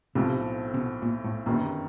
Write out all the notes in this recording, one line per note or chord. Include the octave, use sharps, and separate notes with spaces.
B1 A2 C3 F3 A3 C4
C3
B2
A#2
A2
G1 F#2 A#2 D#3